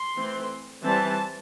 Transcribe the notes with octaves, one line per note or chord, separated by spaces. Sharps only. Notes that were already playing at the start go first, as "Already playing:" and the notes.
Already playing: C6
E3 A3 C4
E3 G3 C4 A5